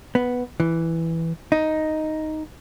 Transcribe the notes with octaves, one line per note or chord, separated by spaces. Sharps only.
B3
E3
D#4